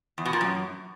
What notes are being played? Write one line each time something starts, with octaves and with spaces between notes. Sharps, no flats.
E2
B2
A#2
F#2